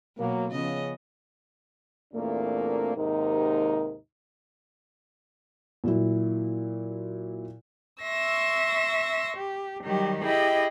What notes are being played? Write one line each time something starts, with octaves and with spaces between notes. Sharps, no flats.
B2 F#3 A#3
C#3 F3 B3 D#5
E2 A#2 A3 A#3 C4 D4
D#2 G#2 C3 D#4 A#4
A#2 F#3 E4
E5 C6 C#6 E6 A#6
G4
D#3 F#3 G3 G4
E4 G4 G#4 D#5 G5 B5